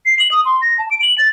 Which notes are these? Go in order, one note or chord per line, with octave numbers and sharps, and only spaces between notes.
C7
F#7
D#6
C6
A#6
A5
D7
F#7
A6